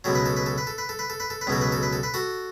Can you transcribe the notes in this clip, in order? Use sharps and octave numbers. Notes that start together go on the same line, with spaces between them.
C#2 B2 F#3 A4
B4
A4
B4
A4
B4
A4
B4
A4
B4
A4
B4
A4
B4
C#2 B2 F#3 A4
B4
A4
B4
A4
B4
F#4 A4